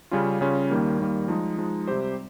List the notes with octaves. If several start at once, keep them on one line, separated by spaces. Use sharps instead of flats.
C#3 G3 C#4 F4
C#3 G3 C#4 F4
D#2 D#3 G3 A#3
D#2 D#3 G3 A#3
F3 G#3 D#4
F3 G#3 D#4
C3 G3 C4 G4 C5